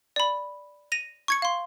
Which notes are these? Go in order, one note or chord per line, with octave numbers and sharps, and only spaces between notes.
D5 B5
A#6 D#7 F7
C#6 G#6 C#7
F5 C6